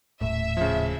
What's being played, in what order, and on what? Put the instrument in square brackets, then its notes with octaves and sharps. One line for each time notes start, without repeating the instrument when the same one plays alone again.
[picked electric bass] D#1 A2 [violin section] E5
[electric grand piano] C#3 F3